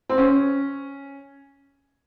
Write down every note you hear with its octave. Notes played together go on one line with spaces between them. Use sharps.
C4
C#4